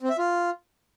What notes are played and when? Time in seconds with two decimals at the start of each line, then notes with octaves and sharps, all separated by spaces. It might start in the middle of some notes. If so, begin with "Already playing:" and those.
0.01 C4
0.09 E5
0.18 F4